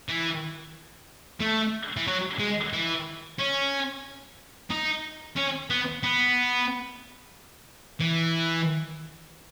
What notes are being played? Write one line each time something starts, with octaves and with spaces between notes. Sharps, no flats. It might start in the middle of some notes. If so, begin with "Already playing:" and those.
E3
A3
E3
F#3
G#3
E3
C#4
D#4
C#4
B3
B3
E3